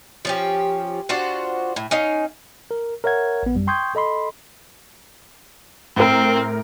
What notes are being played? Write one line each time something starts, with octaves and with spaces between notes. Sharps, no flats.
F3 C#4 G4
D4 F4 F#4 C5
A2
C#4 D#4 F5
A#4
A#4 C#5 E5 F#5 G#6
A1 B3
F#2 G3
G5 C6 C#6 D#6 G6 G#6
A4 D#5 B5 C6
A2 C4 A#4